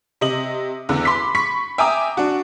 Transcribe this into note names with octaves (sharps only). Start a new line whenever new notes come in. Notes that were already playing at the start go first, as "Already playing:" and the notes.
C3 D#5 F#7
E2 D3
B5 C6 D6 B6
B5 C#6 B6
E5 G5 G#5 A#5 D6 D#6
D4 F#4